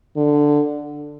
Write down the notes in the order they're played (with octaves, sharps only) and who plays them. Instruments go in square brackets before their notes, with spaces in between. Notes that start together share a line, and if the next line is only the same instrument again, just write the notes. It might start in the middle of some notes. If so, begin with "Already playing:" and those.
[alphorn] D3